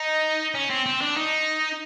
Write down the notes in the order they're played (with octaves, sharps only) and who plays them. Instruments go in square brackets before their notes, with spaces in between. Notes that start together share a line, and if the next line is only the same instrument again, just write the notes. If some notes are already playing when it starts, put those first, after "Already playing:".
Already playing: [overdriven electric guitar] D#4
C#4
C4
C4
D4
D#4